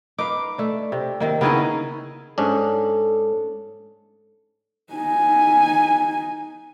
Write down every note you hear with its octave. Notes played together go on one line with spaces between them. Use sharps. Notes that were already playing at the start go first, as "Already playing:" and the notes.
D#4 B4 F5 D6
A3 D4
C3
C3 D#3 A#3
C#3 B3 D#4 E4 G#4 D#5
G#2 C#4 D4 A4
D#4 G#5